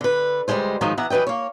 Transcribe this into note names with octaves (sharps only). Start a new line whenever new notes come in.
D3 B4
D2 B2 G3 G#3 C5
G#2 D#3 F3 F#3 G#3 D#4
E3 B3 E5 F#5 A#5
E3 F#3 B4 D#5 G5
A#3 C#5